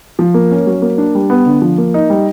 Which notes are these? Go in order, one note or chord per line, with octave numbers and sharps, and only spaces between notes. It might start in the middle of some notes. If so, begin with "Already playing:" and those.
F3
A#3
C#4
F#3
A#3
D4
G3
B3
D3
F3
A#3
D#4
G3